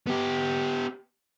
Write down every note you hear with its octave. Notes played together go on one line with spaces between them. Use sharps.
B3 G4